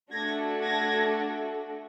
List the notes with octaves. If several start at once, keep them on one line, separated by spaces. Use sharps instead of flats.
A3 D4 F#4 A4 G#6 A#6
G#6 A#6